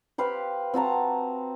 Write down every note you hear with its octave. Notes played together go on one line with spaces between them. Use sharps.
G4 B4 C5 F5
C4 F#4 A5 A#5